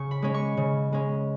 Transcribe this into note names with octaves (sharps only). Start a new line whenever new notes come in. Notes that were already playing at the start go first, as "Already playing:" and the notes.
Already playing: C#3 C#6
B5
G#3 C#4
C#6
C#3
G#3 C#4